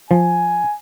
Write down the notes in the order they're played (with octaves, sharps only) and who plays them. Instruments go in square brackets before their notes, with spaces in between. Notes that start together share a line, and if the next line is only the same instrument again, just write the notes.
[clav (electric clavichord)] F3 [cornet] G#5